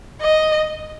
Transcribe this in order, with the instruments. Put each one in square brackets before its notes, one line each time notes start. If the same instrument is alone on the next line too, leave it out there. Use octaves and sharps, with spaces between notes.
[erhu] D#5